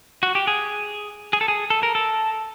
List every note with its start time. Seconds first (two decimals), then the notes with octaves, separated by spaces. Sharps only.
0.23 F#4
0.35 G4
0.47 G#4
1.33 G#4
1.41 A4
1.48 G#4
1.70 A4
1.83 A#4
1.95 A4